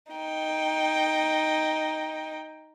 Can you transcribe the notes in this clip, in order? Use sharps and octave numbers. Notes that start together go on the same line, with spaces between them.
D#4 G5